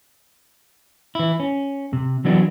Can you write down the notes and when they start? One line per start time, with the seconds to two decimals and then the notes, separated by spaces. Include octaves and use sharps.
1.15 E3 E4
1.40 C#4
1.93 C3
2.25 E3 F#3 B3 D4